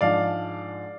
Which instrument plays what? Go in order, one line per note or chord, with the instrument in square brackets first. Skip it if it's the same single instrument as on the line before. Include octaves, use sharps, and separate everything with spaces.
[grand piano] G#2 F3 G#3 D4 D5 F5